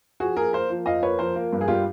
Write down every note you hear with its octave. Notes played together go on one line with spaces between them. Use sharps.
F3 F#4 G#4
A#3 G#4 A#4
A#3 A#4 C5
F3
F2 D#5 F5
A#3 B4 C#5
F3 A#4 C5
A#3
G2
G#4
G3 F4 G4